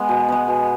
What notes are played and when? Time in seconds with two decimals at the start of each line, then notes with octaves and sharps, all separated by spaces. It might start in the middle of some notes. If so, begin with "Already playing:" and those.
Already playing: G#3 B3
0.09 B2
0.29 G#3 B3
0.48 B2